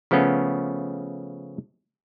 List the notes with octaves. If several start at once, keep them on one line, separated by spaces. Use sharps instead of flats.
C#3 F3 A3 B3 C#4